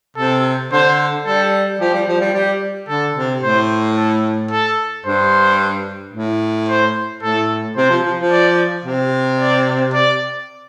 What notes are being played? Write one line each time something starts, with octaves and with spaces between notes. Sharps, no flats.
C3 A4
D3 C5
G3 A4
F3 G4
G3
F3
G3
G3 G4
D3 A4
C3
A2 C5
A4
A4
G2 C5
A2
C5
A2 A4
C3 C5
F3
F3
F3
D5
C3
D5
D5